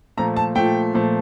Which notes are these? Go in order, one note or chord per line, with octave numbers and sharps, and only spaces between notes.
A#2 F3 A3 A#5
A5
A#2 F3 A3 G5
A#2 F3 A3